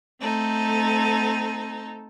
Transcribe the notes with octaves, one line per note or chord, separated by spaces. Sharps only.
A3 C4 D#4 A4